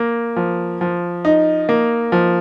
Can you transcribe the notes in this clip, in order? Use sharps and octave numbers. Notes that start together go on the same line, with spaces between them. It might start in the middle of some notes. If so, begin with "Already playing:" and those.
Already playing: A#3
F3
F3
D#4
A#3
F3